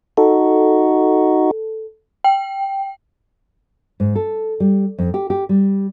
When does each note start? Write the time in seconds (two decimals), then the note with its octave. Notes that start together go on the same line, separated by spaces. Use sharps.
0.17 D#4 F#4 A4
2.24 G5
4.00 G#2
4.15 A4
4.60 G3
4.98 F2
5.14 G4
5.30 G4
5.49 G3